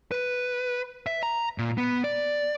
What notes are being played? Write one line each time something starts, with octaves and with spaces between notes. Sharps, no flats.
B4
E5
A#5
A#2
B3
D5